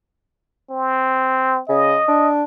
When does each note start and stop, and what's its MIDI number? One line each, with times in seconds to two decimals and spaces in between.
0.71 1.61 60
1.69 1.97 49
1.69 2.29 75
2.08 2.44 62